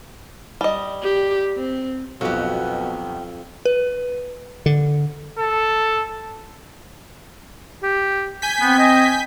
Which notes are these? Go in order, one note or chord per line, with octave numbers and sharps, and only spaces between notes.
G3 D#5
G4
C4
B1 F2 B2 F#4 G4
B4
D3
A4
G4
G#5 G6 B6
B3 C4
D#5